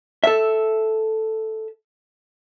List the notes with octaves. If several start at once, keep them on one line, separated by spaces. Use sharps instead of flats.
A4 E5